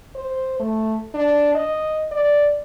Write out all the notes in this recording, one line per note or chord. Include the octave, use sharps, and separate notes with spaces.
C5
A3
D4
D#5
D5